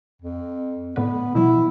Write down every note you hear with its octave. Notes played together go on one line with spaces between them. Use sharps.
F2
A2 D3 B3 B4
B2 E3 F#3 E4